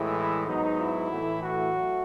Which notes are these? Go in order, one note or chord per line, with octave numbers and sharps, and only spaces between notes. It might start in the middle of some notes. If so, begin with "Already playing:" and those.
Already playing: A2 E3 G#3
E4
G#2 F#3 B3 D#4
E4
A2 E3 A3
F#4
F#3 A3